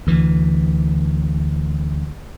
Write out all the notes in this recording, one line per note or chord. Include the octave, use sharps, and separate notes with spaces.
D2 E3